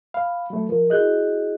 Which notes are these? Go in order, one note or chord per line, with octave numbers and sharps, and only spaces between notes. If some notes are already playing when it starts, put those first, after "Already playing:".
F5 B5
F#3 A3
F3 A#4
E4 F#4 G#4 D#5 F#6 G6